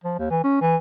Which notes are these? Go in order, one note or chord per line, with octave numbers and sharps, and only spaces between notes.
F3
D#2
E3
C#4
E3